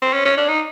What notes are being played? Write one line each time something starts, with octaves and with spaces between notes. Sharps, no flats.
C4
C#4
C#4
D4
D#4